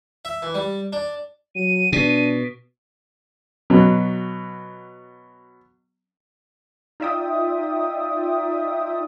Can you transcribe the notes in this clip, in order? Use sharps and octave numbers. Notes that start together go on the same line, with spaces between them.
E5
E3
G3
D4
F#3 D#7
B2 D4
B2 F#3
D#4 F4 D5 E5 G5 D#6